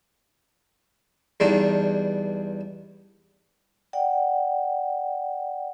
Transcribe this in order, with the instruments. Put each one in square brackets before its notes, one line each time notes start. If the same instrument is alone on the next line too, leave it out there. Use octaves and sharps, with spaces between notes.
[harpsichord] E2 G2 D4 D#4
[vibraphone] D5 F#5 G5